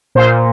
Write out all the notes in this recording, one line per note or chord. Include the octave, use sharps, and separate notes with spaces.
A#2 C5